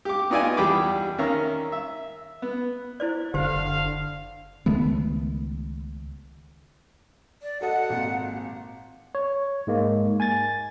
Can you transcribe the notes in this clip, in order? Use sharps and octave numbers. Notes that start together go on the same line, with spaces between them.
G4 D6
B3 D#4 F4 D5 E5 G#5
E2 G3 G#4 G5 B5 D6
D#3 C#4 E5 F5 A#5
E5
B3
E4 C5 D5
F#1 D3 G4 C5 F5
C#2 D#3 A3 B3
D5
F#4 A4 D#5 F#5
G#1 A#2
C#5
G#2 G#3 A#3
G#5 G#6 A6